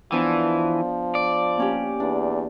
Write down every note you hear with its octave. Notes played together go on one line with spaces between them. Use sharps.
E3 F3 B3 D4 C5
D5
A#3 C#4 G4
E2 D4